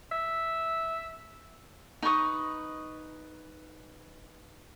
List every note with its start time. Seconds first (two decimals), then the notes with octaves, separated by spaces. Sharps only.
0.12 E5
2.02 D#4 B4 C#6 D#6